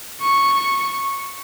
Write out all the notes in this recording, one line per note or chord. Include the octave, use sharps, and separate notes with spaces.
C#6